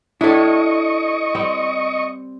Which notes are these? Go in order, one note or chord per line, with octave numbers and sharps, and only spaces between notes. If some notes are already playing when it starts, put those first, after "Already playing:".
D4 E4 A4 C#5 D#5 C#6
G3 C4